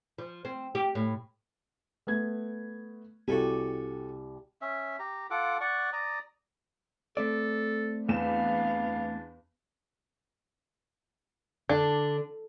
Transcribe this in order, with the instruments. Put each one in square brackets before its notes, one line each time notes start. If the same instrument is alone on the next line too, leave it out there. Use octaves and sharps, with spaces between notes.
[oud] F3
C4
G4
A2
[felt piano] A3 B3 G#6
[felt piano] C2 [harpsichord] F#4 A4 G#5 [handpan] G4
[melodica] C#4 E5
G4 A#5
F4 A4 F#5 D6
D5 F#5 C#6
D5 A#5 D#6
[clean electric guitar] A3 C4 D5 [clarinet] A4
[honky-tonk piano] E2 E7 [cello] B3 F5 [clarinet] D4
[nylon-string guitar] D3 [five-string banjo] D4